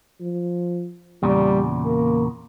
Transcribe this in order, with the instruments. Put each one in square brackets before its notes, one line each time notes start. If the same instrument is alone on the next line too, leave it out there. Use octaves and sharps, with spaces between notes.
[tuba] F3
[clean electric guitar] E2 A#2 C#3 [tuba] G3
[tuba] A#3